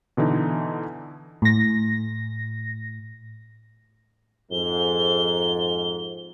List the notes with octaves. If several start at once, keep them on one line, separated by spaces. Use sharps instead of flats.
B2 D3 E3 D#4
A2 A#6
F2 G#2 G7